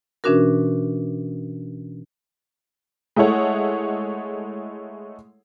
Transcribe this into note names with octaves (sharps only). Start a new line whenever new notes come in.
B2 E3 C#4 D4 F#4 A#4
G#3 A3 E4 A4 C#5 F#5